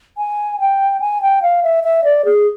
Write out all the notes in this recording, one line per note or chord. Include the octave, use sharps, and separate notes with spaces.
G#5
G5
G#5
G5
F5
E5
E5
D5
G#4